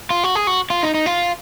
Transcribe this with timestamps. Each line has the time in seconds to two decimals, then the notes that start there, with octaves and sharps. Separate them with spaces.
0.10 F4
0.24 F#4
0.35 G#4
0.47 F#4
0.70 F4
0.83 D#4
0.94 D#4
1.06 F4